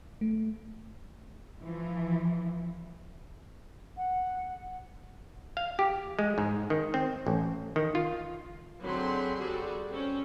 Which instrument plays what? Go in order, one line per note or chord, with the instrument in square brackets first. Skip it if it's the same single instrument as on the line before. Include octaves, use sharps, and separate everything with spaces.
[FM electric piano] A3
[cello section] E3 F3
[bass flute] F#5
[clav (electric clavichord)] F5
G4
G#3
G#2
D#3
C4
A1
D#3
F4
[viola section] D3 F#3 C4 G#4 B5 C6
G3 F#4 G#4 A4
C4 C#4